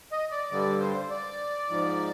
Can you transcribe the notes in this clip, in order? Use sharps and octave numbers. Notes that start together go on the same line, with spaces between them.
D#5
D5
G2 D3 G3 D5
C5
D5
G#2 F3